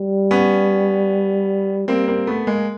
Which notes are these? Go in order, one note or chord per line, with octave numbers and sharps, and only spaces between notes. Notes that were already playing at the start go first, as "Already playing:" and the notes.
Already playing: G3
B3 C#4
G3 A#3 C4
A#3 C4
A3 B3
G#3 A#3